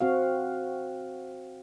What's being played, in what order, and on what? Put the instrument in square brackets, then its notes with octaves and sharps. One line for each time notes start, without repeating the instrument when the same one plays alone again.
[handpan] C4 F#4 F5